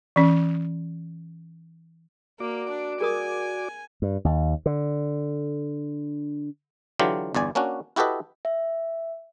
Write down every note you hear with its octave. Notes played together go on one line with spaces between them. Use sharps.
E3 C#4
A#3 F#4 D5 D6
D4
G#4 A#4 G#5 D#6
G2
D#2
D3
D3 E3 F#3 F4 G4
G1 E2 D5 G#5
A#3 C#4 D4 F#4
E4 F#4 G4 A4 B4 D#5
E5